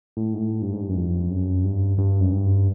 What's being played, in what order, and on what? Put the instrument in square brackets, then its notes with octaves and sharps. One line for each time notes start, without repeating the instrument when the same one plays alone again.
[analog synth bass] A2
G#2
A2
G2
G#2
G2
F#2
F2
F#2
G2
G2
F#2
G2